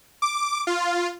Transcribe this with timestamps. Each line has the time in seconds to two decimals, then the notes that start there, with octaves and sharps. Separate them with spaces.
0.22 D6
0.67 F4